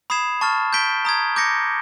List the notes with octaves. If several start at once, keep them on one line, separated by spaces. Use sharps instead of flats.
B5 D#6 G#6 C7 E7
A5 C#6 F6 A6
G6 B6 D7 G7
A#5 D#6 G#6
D6 G6 A#6 C#7